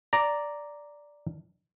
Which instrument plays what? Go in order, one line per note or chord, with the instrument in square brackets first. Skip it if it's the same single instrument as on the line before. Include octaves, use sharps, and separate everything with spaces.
[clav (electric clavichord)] D5 A#5